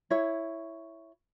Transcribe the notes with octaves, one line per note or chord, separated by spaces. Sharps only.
E4 C#5